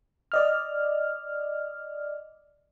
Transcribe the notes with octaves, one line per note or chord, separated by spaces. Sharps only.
D5 D#5 F6